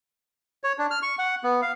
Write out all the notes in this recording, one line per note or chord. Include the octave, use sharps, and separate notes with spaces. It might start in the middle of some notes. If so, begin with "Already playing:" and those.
C#5
D4
F6
C#6
F#5
B3
F5